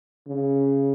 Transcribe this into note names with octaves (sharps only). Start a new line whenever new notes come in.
C#3